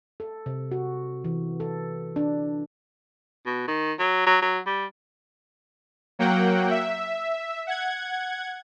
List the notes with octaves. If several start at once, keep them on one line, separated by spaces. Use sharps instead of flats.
A4
C3
F#4
E3
A4
D4
B2
D#3
F#3
F#3
F#3
G3
F#3 A#3 F#5 G5
E5
F#5 G#6